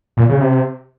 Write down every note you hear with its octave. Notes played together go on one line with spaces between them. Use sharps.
A#2
C#3
C3